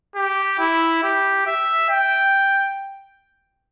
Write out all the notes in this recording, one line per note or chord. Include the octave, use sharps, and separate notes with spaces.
G4
E4
G4
E5
G5